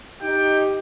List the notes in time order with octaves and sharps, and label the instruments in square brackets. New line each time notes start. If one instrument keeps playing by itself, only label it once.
[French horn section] D#4 [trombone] G4 [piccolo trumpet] G5